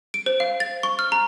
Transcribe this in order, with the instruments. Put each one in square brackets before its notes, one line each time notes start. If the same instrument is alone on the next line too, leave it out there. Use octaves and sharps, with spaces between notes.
[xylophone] D7
C5
F5
A6
C#6
F6
A#5